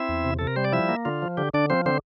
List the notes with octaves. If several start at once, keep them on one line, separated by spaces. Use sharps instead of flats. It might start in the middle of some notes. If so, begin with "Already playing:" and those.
Already playing: C4 E4 E5
E2
C3
C3 A4
A#4
G3 C5
D5
F3 E4 E5
A#3
D3 F4
F3
D3 G4
D3 D4 D5
F3 C4 C5
D3 C4 C5